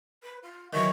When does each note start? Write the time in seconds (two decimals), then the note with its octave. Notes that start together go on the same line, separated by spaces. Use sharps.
0.23 B4
0.43 F4
0.73 D#3 E3 F#3 C#6